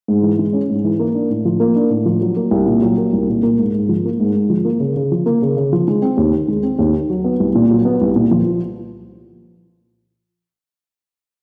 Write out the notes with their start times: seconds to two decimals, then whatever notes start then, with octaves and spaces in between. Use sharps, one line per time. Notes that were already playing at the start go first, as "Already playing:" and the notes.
0.08 G#2
0.23 E3
0.39 G#3
0.53 C#4
0.69 G#2
0.85 E3
0.99 A#3
1.15 D4
1.30 A2
1.45 F3
1.60 A#3
1.76 D4
1.90 A2
2.06 F3
2.22 F#3
2.36 A#3
2.51 C2
2.66 A#2
2.82 F#3
2.98 A#3
3.13 C2
3.28 A#2
3.43 A#3
3.58 G#2
3.73 G#2
3.89 F3
4.05 A#3
4.20 G#2
4.35 G#2
4.50 F3
4.65 A#3
4.80 C#3
4.96 C#3
5.12 F3
5.26 A#3
5.42 C#3
5.57 C#3
5.73 F3
5.88 G#3
6.02 C4
6.17 D#2
6.33 D#3
6.48 G#3
6.63 C4
6.79 D#2
6.94 D#3
7.10 F#3
7.24 B3
7.40 C2
7.55 A#2
7.71 F#3
7.85 B3
8.01 C2
8.16 A#2
8.31 F3